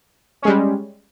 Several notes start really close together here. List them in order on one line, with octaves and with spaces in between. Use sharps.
C#4 G#3 G3